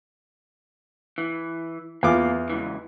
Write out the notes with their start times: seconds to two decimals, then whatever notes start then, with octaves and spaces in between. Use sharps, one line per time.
1.18 E3
2.03 E2 A#3 F4 D6
2.50 C#2 E3